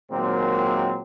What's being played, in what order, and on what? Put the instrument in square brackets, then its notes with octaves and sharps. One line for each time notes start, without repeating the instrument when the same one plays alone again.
[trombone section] A#2 D#3 F#3 G#3 A#3 C4